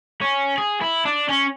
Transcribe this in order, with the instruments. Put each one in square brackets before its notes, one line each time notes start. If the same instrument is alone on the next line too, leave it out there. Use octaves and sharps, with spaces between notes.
[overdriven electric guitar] C#4
G#4
E4
D4
C#4